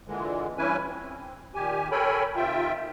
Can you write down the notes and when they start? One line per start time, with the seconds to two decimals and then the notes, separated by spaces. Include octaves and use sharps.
0.07 A#2 D3 E3 G#3
0.58 G2 E3 C#4 E4 B4 G#5
0.86 C4
1.55 A#2 D#3 G4 G#5
1.92 A4 A#4 C#5 G5 G#5 B5
2.36 C3 D#3 F4 E5 G5